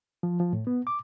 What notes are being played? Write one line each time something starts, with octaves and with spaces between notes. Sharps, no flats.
F3
F3
A2
B3
D6